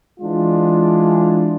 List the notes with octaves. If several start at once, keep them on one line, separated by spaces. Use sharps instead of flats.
E3 G#3 D4 F4